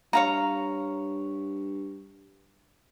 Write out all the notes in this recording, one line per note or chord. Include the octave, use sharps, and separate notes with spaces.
G2 C#5 F5 A#5